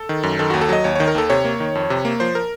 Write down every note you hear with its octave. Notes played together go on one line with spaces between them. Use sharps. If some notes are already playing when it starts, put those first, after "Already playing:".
Already playing: A4
D#3
F#2
D#3 A4
D#2 F#4
A4
F#3 D#5
D#2 C#5
D#3 C#5
A#4
D#2 A4
C3 C#5
A#3
D#3
F2
C3
A#3
F3 C5
A#4